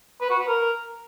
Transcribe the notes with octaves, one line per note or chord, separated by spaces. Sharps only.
B4
F#4
B4
A#4